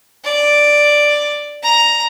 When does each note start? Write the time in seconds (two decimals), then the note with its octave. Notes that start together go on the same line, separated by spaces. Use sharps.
0.24 D5
1.63 A#5